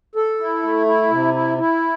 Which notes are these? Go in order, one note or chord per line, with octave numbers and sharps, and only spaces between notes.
A4
E4
A3
E4
C3
E4
E4